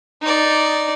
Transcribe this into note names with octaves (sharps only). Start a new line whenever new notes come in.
D#4 D5